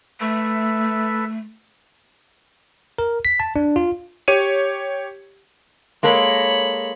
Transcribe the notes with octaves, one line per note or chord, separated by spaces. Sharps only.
A3 A4 B4 E5
A#4
B6
A5
D4
F4
G4 C#5 D#7
G#3 A#3 A4 C#5 B5